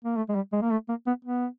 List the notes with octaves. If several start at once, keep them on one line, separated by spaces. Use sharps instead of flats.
A#3
A3
G#3
G3
G#3
A#3
A3
A#3
B3
B3